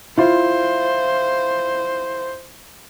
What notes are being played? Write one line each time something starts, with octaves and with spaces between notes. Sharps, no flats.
E4 F4 C5